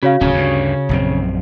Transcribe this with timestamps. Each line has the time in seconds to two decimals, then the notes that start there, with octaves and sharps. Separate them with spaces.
0.03 C#3 F#4 C#5 F5
0.21 D1 C#3 C#4
0.33 D2 G2
0.89 A#1 F#2 C4